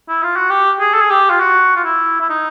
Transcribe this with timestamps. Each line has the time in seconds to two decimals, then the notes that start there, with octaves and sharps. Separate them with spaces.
0.09 E4
0.23 F4
0.36 F#4
0.50 G4
0.80 G#4
0.94 A4
1.01 G#4
1.10 G4
1.30 F4
1.40 F#4
1.76 F4
1.84 E4
2.20 E4
2.30 D#4